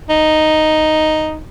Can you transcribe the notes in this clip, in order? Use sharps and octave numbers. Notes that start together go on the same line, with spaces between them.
D#4